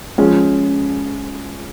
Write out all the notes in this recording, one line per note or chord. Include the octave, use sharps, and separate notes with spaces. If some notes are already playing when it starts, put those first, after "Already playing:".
F3 G#3 C#4